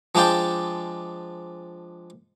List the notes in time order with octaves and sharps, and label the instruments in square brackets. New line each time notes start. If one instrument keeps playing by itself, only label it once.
[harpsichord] F3 G#3 D4 F5 G5 A5